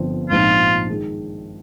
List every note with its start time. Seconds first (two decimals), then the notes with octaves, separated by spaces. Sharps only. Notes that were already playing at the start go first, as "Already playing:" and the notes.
Already playing: G1 G2 F3 C4 F4
0.30 A#1 G#2 F3 C4 D#4 F4
0.89 D#3 G#3